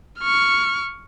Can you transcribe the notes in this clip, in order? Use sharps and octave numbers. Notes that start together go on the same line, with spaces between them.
C#6 F6